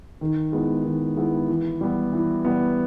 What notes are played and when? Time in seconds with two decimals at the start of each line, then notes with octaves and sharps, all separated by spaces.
0.21 D#3
0.52 G#3 B3 E4
0.84 D#3
1.16 G#3 B3 E4
1.48 E3
1.81 G3 B3
2.13 E3
2.45 G3 B3